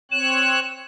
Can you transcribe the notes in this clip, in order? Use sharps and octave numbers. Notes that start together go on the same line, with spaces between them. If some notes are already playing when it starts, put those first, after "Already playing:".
C4 C#5 F#6 E7